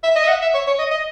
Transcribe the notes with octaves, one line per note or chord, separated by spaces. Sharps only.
E5
D#5
E5
F#5
E5
C#5
C#5
D#5
D#5